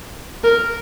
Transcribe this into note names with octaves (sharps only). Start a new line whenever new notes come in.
A#4